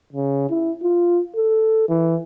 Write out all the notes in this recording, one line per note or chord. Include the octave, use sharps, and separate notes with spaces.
C#3
E4
F4
A4
E3